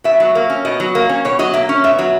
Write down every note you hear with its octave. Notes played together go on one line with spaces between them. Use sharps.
B2 E5
F#3
A#3
C#4
B2 D#5
F#3
A#3
C#4
B2 C#5
F#3 D#5
A#3 E5
C#4
B2 E5
F#3